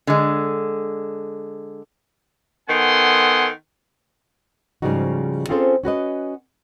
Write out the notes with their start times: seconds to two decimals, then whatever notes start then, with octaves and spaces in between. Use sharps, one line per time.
0.07 D3 G#3
2.69 D#3 B3 A4 F#5 G#5 C6
4.82 G#2 C#3 F3 G3 D#4 F#4
5.49 C4 C#4 F4 G#4 A4 C5
5.83 C#4 F#4 B4 D#5